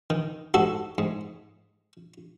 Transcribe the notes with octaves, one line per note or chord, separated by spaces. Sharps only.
D#3
G#2 F#4 A4
G#2